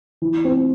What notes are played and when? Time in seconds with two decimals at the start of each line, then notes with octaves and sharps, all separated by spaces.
0.22 E3
0.45 C4